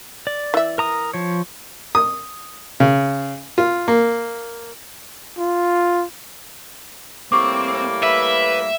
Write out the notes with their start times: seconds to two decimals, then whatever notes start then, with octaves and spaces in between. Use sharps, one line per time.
0.27 D5
0.54 E3 E5
0.78 A#4 A#5 D#6
1.14 F3 C#5
1.95 D#6
2.80 C#3
3.58 F4
3.88 A#3
5.38 F4
7.32 A2 G3 A#3 C4 C#6 D6
8.03 B4 E5